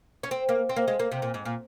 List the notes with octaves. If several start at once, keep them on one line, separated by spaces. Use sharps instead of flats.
C#4
C4
A#3
C4
A#3
G#3
A#3
C3
A#2
G#2
A#2